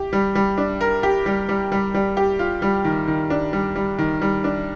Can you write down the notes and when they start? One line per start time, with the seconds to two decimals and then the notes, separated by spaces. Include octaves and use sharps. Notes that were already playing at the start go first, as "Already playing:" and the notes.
Already playing: G4
0.13 G3
0.35 G3
0.58 D4
0.81 A#4
1.03 G4
1.26 G3
1.49 G3
1.72 G3
1.94 G3
2.17 G4
2.39 F4
2.62 G3
2.84 D#3
3.08 D#3
3.30 D4
3.53 G3
3.75 G3
3.98 D#3
4.21 G3
4.44 D4